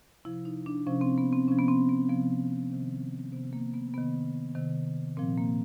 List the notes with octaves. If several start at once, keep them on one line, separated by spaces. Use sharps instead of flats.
C3 F3 E4
D#4
D4
C3 F3 C#4
C4
B3
C4
C3 F3 C#4
B3
C4
B3
C3 F3 B3
C3 D#3
C3 D#3 B3
A#3
B3
C3 D#3 B3
C3 D#3
A#2 F3 C4
A#3